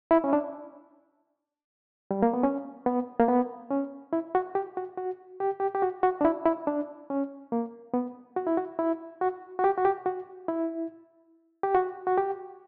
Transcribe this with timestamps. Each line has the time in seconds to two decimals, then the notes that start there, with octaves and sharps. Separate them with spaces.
0.11 E4
0.24 C#4
0.33 D4
2.11 G3
2.22 A#3
2.34 B3
2.43 C#4
2.86 B3
3.20 A#3
3.28 B3
3.71 C#4
4.13 E4
4.35 F#4
4.55 G4
4.77 F#4
4.97 F#4
5.40 G4
5.60 G4
5.75 G4
5.82 F#4
6.03 F#4
6.21 D4
6.25 E4
6.46 E4
6.67 D4
7.10 C#4
7.52 A#3
7.94 B3
8.36 F#4
8.47 E4
8.57 F#4
8.79 E4
9.21 F#4
9.59 F#4
9.64 G4
9.78 F#4
9.85 G4
10.06 F#4
10.48 E4
11.63 G4
11.75 F#4
12.07 F#4
12.18 G4